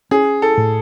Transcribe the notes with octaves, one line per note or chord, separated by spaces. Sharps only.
C#4 G#4
A4
A2